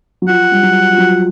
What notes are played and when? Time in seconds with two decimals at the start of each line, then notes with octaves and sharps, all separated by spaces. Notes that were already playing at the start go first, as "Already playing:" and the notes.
0.22 F#3
0.28 F3 F#5
0.52 G3
0.63 F#3
0.93 F3
0.98 F#3